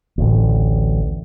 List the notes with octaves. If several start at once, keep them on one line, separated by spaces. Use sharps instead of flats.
A1 D2